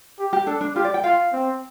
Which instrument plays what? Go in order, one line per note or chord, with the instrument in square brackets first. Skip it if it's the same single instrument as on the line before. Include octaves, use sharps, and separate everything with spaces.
[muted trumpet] G4
[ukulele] G4
[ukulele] D4 [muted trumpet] A4
[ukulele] D4
[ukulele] F4 [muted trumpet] G4
[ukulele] D5
G5
[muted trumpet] F4 [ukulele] F5
[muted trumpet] C4